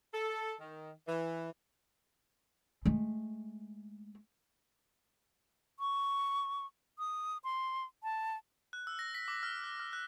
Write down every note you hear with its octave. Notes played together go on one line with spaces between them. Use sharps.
A4
D#3
E3
G#3 A3
C#6
D#6
C6
A5
F#6
E6
A#6
B6
D6
F6
F#6
F6
F#6